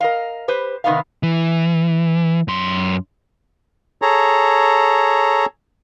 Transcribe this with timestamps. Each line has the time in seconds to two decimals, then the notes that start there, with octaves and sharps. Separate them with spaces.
0.01 A#4 D#5 F5
0.48 G4 B4 C5
0.84 C3 D#3 G#3 B3 D#4 F5
1.23 E3
2.48 F#2 C6
4.02 G#4 A4 C#5 A#5